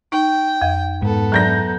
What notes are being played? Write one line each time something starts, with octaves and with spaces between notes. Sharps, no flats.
D#4 G5
F2 E5
G#2 B3 A4
F#3 D5 A#5 G6 A#6